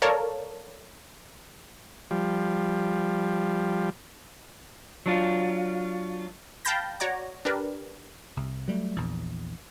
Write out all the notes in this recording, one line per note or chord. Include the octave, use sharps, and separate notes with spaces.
A4 A#4 C#5 D5 F5 A5
F3 G3
F#3 D4 F4
F5 G5 A5 B5 G6 A#6
F#4 C#5 D5 A#5 D6
D4 G4 A#4 B4
C2
F#3 G3 A3
A#1 E2